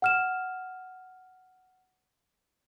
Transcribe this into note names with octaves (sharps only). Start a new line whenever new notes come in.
F#5 F6 E7